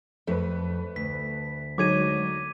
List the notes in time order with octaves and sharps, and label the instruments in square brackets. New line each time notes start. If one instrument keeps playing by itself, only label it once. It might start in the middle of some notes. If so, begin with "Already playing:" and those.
[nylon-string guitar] F2 [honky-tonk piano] A3 B4
[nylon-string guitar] D2 [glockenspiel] B6
[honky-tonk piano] D3 D#4 [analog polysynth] F#3 G#3 C#5 [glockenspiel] D6 G#6 D#7